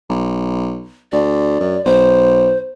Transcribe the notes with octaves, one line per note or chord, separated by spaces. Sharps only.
B1
D2 D5
F#2
B1 C5